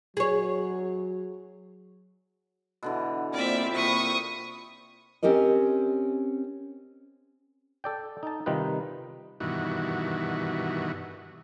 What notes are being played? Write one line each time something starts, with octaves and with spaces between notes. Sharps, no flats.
F#3 G#4 C#5
B2 D3 E3
G3 A#3 C4 F4 D5 E5
C3 B5 C#6 D#6
C4 C#4 G4 A#4 D#5
A4 D5 G5
D#4 A5
C3 D#3 G3 D#4 F4 B4
G2 B2 D#3 E3 F#4